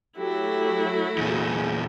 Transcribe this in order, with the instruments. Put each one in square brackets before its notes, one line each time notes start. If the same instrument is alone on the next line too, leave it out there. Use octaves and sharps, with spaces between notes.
[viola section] F#3 A3 A4 [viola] E4 F#4 [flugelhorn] G4
[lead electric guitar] E2 A#2 [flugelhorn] G#4